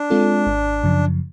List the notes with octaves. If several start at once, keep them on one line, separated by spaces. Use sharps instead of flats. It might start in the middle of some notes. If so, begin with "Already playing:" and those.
Already playing: D4
G#3 C4 F4 A4
G#1
F#2 C#3 F3